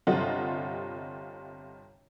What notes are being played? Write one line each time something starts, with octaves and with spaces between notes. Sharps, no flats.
G1 C3 G3 F4 D#5 F#5